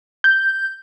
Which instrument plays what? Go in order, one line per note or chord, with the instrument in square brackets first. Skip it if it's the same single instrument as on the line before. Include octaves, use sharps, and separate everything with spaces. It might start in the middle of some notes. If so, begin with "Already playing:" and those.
[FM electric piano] G6